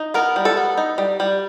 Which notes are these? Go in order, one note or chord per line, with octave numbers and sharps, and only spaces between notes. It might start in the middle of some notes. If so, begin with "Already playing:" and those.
Already playing: D#4
B3 A#4
G3
A4
B3
D#4
G3
G3